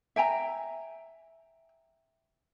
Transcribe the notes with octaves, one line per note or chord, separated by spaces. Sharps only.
E5 G5 G#5 A#5